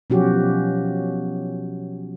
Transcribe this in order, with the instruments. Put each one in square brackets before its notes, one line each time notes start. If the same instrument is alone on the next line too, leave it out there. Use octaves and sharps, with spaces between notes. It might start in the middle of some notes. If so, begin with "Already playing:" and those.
[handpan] B2 F3 F#3 C#4 F#4 G4